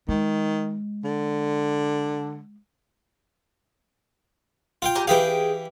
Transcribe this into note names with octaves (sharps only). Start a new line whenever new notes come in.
D#3 G#3
D3
F4 F5 G5
G4 G#5 A#5
E3 G4 G#4 F5 G5